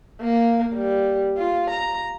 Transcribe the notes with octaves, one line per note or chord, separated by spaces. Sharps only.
A#3
G3
F4
A#5